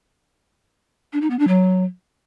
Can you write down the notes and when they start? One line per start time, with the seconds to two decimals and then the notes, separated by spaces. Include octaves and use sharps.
1.13 D4
1.21 D#4
1.30 B3
1.39 D4
1.48 F#3